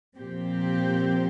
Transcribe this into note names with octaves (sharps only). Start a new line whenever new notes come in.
A#2 F3 C4 G4